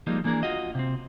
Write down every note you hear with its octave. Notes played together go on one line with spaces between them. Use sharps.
F3 G3 G#3 A#3 D#4
E3 A#3 D4 G#4 A#4
F4 F#4 D#5
C3 C4